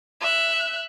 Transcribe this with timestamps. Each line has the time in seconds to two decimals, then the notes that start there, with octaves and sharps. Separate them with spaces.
0.21 E5 F#6